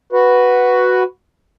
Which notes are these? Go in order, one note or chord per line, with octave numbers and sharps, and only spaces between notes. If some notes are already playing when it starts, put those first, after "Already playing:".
F#4 B4